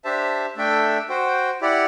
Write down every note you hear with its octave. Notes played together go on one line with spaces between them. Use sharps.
D4 G4 C5 E5 A5
A3 D4 A4 E5 G5
F#4 C5 G5
E4 G4 D5 F#5